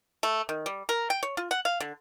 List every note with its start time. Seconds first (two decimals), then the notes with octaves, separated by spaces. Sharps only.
0.23 A3
0.49 D#3
0.66 G3
0.89 A#4
1.10 G5
1.23 C#5
1.37 F4
1.51 F#5
1.65 F5
1.80 D3